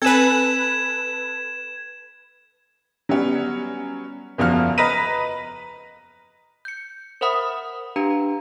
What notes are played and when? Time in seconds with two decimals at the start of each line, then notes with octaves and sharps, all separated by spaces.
0.02 C4 A4 B4 G#5 G#6 E7
3.09 F#3 G3 B3 C#4
4.38 F#1 E2 F3 F#4 F6
4.78 B4 D#5 A#5 A#6 B6 D#7
6.65 G6 C#7
7.21 A#4 C5 E5 F#5 B5 D#6
7.96 D4 G4 B4 F5 A#5